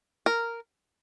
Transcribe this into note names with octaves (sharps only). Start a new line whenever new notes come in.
A#4